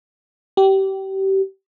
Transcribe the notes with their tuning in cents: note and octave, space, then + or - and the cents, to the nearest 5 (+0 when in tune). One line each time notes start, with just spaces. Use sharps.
G4 -25